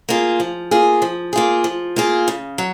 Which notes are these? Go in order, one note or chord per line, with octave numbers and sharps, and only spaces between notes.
A#3 F4 G#4
F3
A#3 F4 G#4
F3
A#3 F4 G#4
F3
A#3 F4 G#4
C#3
F#3